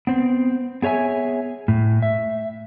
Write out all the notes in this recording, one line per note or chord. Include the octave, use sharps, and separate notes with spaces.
B3 C4
B3 G#4 C#5 E5 G#5
A2
E5